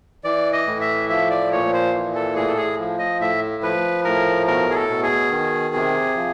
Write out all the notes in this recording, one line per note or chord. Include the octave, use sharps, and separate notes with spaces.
E3 D5
D#5
A2
E5
F3 E5
D5
A#2 C#5
C5
E3
A4
A2 G#4
A4
G#4
F3
D#5
A2 E5
F3 B4
A2 A#4
B2 A#4
G#4
A4
B2
G#4
D#3
C3
F3